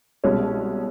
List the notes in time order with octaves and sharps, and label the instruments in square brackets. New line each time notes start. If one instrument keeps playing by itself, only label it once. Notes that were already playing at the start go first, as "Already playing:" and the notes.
[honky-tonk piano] C2 B2 G#3 C#4